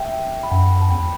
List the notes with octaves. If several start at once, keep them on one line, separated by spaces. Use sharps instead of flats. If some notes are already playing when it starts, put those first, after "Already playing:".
Already playing: E5 G5
B5
F#2 F#5 A5
G5 B5
A5
E2 G5 B5